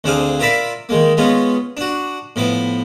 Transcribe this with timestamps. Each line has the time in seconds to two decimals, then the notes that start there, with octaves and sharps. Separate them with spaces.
0.04 D2 D3 C4 D4 G#4 F5
0.40 F4 A#4 D5 E5 B5 D6
0.89 D#3 G#3 A#3
1.17 G#3 B3 C#4 F4
1.77 D4 F#4
2.36 A2 F3 B3 D6